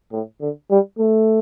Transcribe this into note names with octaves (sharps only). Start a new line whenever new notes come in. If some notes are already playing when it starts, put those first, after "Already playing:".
A2
D3
G3
A3